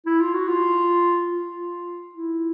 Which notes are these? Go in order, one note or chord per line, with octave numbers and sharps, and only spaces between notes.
E4
F4
F#4
F4
F4
E4